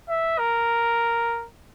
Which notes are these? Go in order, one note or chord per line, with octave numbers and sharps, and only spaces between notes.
E5
A#4